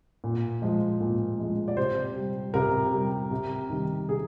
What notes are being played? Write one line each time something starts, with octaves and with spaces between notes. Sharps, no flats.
A#2
F3 G#3
A#2
F3 G#3
D5
C3 C5
G3
C3 A#4
G3
C3
D#3 G3
C3 G#4